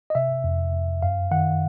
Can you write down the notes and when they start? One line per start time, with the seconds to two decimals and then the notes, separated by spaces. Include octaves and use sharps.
0.10 D#5
0.15 C3 E5
0.44 F2
0.73 F2
1.02 F#2 F5
1.31 D#3 F#5